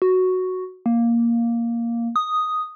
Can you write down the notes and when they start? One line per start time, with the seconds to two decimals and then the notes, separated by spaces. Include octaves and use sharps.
0.02 F#4
0.86 A#3
2.16 D#6